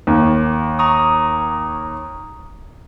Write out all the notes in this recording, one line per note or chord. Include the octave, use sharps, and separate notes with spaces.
D#2
A#5 C#6 D#6